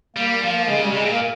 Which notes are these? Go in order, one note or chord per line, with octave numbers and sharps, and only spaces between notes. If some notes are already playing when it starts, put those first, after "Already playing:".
G3 A#3
F3 A#3
A#3
C#3 G#3
G3
C3 G#3
A#2 A#3